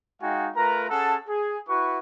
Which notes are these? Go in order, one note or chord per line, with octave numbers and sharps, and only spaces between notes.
G#3 D#4 F#4 F5 G5 G#5
A3 F4 A#4 B4 A#5
C#4 G#4 A4 F#5 A5
G#4
E4 F#4 B4 C#6